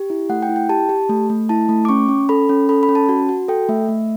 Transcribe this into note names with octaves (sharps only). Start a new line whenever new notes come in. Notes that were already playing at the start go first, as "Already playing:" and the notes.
Already playing: G4
E4
A3 F#5
G5
E4
G5
G4 A5
G4
A3
A3
E4 A5
A3
D6
C#4 C#6
C#4
A4 B5
C#4
A4 B5
B5
C#4
A5
F#4
F#4
A4 G5
A3 E5
A3